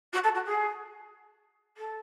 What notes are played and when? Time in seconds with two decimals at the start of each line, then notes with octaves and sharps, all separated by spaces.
0.12 F#4
0.23 A4
0.34 F#4
0.46 G#4
1.77 A4